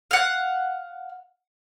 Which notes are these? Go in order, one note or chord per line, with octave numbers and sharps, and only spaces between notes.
F5 F#5